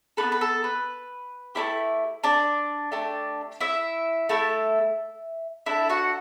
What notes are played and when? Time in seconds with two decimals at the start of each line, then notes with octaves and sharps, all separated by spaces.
0.17 B3 D4 A4 B4
0.32 B4
0.41 A4
0.64 B4
1.55 A3 C#4 E4 G4
2.24 D4 D5
2.92 A3 D4 G4
3.61 E4 E5
4.29 A3 E4 A4
5.66 D4 E4 A4 E5
5.89 F#4 F#5